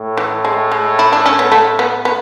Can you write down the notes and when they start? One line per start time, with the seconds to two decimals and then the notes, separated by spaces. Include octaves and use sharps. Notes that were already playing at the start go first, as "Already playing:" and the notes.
Already playing: A2
0.17 E3
0.45 G#3
0.72 G#3
0.99 E4
1.13 D4
1.26 C#4
1.39 B3
1.52 A3
1.79 B3
2.05 B3